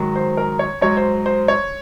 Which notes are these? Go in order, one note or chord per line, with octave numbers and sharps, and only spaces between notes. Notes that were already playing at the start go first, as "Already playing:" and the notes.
Already playing: G#2 D#3 F#3
C5
A#4
C#5
G#2 F#3 C#5
C5
C5
C#5